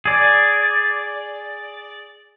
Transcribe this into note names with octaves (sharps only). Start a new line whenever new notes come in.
G#4 D5